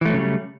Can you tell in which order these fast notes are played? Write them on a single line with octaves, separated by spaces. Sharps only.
E3 A3 F#3 C#3 G3